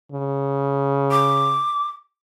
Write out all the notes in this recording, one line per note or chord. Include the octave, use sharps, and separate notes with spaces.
C#3
D6